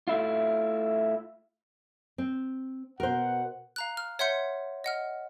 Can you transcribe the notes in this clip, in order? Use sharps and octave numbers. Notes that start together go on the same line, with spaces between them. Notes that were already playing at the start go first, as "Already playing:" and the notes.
A3 E4 F4
C4
B2 A#4 C5 F#5
F5 A#5 F#6
F6
C#5 E5 F#5 C6 G6 C#7
D#5 F#5 F6